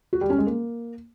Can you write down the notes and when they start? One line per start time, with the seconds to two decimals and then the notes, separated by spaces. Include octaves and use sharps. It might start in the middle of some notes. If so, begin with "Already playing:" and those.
0.13 F#4
0.21 G3
0.30 C#4
0.38 G#3
0.47 A#3